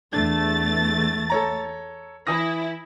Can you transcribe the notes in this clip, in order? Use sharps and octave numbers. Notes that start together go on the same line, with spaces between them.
E2 A3 D4 A6
A4 C#5 A#5
E3 E4 D#6 A#6